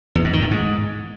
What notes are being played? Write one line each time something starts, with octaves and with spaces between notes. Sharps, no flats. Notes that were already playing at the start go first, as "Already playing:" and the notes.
E2
G#2
D#3
A2
G#2